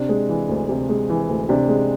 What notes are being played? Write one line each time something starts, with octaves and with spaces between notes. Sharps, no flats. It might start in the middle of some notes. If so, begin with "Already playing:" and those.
Already playing: C3 D4
G#3
E3
D2
C3
G#3
E3
D2
C3 D4
G#3